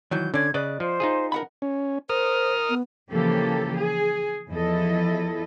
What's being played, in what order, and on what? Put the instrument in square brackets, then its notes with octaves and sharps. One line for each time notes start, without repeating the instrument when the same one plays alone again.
[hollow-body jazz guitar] C2 D#3 E3 [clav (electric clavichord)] F#3 [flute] G6
[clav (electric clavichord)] D3 [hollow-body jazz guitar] C#4 D5 [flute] G#6
[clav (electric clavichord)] C#3 [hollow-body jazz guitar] B4 D5 D#5 [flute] F#6
[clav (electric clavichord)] F3 [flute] C5
[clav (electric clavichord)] D#4 F4 G#4
[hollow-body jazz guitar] A#4 F#5 B5
[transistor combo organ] C#4
[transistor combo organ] A#4 D#6 F6 [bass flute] C5
[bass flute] B3
[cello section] C#3 E3 F3 A#3 G4 A4
G#4
E2 F3 E4 A4 D#5